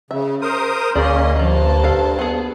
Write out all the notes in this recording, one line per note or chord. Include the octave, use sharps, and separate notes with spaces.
C#3 E5
A#4 C5 D#6
D2 A#3 C#4 G#4 D5 D#5 C6
G2 F3 F#3 A#3 C5 A5
A4 F5
B3 G#4